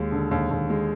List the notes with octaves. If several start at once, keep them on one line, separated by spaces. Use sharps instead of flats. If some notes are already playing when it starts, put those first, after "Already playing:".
Already playing: D#2 G#3
D3
D#2
D#2
G#3